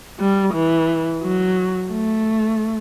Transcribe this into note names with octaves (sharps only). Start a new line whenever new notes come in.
G3
E3
F#3
A3